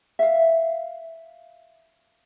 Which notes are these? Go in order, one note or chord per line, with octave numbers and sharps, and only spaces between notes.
E5 F5